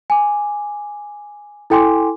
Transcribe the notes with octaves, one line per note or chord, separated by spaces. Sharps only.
G#5 D6
E4 A4 G5 G#5 C6 D6